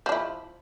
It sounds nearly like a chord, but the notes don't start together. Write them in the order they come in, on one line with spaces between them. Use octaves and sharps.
F3 D4 E4